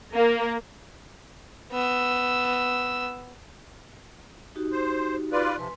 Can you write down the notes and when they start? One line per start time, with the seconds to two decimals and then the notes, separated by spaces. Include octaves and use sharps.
0.14 A#3
1.72 B3 E6
4.56 D#4 F#4 G4
4.72 C5
5.32 F4 B4 D5
5.58 C3 F3 B4 G#5 C6